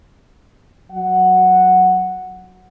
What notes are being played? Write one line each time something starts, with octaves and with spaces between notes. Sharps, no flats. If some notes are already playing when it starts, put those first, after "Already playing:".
F#3 F#5